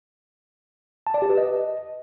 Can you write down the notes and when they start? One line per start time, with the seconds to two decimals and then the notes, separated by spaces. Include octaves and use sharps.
1.07 A5
1.14 D5
1.22 G4
1.30 B4
1.38 D#5